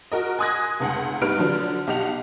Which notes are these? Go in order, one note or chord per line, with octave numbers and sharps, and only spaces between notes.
F#4 A#4 D#5
G#5 C6 D#6 F#6 G#6 A#6
F1 C#2 F#5
G2 B3 D#4 B4 F6 D7
D3 F3 F#3
B1 G4 D#5 F#5 F7